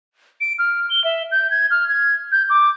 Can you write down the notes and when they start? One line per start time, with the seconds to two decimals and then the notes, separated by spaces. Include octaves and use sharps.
0.41 D7
0.59 F6
0.90 G7
1.04 E5
1.32 G6
1.51 G#6
1.71 F6
1.89 G#6
2.32 G6
2.50 D6